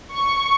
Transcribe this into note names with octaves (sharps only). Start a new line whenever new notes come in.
C#6